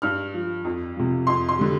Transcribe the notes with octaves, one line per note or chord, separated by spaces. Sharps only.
G2 F6
F3
F2
C3 F3
F2 C6
C6
D3 G3